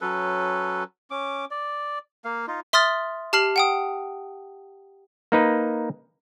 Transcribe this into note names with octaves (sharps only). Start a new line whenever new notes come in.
F#3 C#4 A4 B4
C#4 D6
D5
A#3 F5
D#4 F4
E5 C6 D#6 F6 A6
G4 A5 F6 C7 E7 F#7
F#5 G5 D#6
A#3 D#4 B4